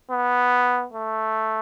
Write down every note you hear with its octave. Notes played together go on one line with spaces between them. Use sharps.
B3
A3